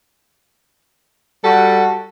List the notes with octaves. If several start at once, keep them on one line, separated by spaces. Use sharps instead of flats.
G3 F#4 A4 F#5